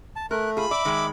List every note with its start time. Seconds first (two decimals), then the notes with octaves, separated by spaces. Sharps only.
0.16 A5
0.31 A3 A#4 F#6
0.57 F4 G#4 B5
0.71 D5 E5 D6
0.85 D#3 G#3